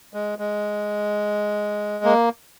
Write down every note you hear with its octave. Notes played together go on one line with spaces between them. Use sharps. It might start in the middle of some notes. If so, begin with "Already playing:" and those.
G#3
G#3
A#3